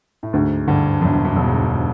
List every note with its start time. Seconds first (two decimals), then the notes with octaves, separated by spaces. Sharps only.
0.23 A2
0.33 D2 G#2
0.67 G2 D3
1.01 E1 F#2
1.25 G2
1.36 E1
1.47 G#2